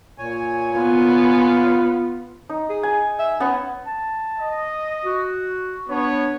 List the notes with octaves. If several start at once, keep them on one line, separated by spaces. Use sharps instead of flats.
A#2 C#5 G#5
B3 F4
D#4
G#4
G#5
E5
B3 C#4
A5
D#5
F#4
B3 D4 C#5